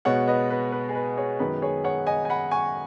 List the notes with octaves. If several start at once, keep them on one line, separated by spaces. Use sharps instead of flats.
B2 G#3 B3 C#5 F#5
B4 D#5
B4
B4
G#4
B4
G#4 C#5
F#2 D#3 G#3 B3 B4
G#4 C#5
C#5 F#5
D#5 G#5
G#5
F#5 B5
G#5 C#6